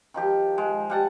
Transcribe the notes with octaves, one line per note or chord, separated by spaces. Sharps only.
D#3 F3 G4
G#3
G3 F#5 A5